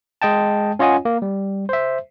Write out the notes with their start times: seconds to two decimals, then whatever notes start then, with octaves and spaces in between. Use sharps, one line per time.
0.22 G#3 D#5 G5 A5
0.79 C#4 F4 C#5 D#5 F#5 G#5
1.05 A#3
1.22 G3
1.69 C5 E5